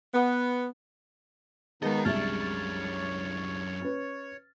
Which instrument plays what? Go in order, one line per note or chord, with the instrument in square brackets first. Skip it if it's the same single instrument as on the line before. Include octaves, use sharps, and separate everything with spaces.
[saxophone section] B3
[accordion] D#3 B3 D#4 [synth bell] G#3 G#4 [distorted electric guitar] D#5 F5
[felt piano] C2 G#3 E5 [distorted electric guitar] F#2 D4 [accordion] C#5 [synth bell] F6 A6
[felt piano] C#4 B4